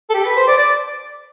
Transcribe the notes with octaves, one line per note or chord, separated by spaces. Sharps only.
A4
G4
B4
C5
D5
D5